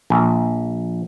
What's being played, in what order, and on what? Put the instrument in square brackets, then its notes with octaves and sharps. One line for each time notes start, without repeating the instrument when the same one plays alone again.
[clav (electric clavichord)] A#1